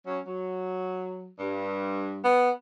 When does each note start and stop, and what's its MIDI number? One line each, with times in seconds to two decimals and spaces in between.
0.06 0.19 54
0.06 0.19 61
0.27 1.28 54
1.39 2.26 43
2.24 2.50 59